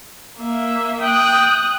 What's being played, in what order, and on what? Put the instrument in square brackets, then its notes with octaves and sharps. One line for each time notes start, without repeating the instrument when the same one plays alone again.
[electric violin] A#3 E5
[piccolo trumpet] G5 [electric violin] D#6 F#6